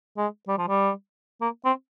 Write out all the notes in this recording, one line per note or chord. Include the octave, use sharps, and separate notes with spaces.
G#3
G3
F3
G3
A#3
C4